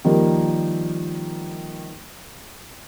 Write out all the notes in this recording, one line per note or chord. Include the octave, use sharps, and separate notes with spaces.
D#3 F3 G3 A#3